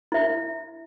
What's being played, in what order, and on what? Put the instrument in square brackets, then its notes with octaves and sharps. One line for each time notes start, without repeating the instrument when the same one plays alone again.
[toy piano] E4 E5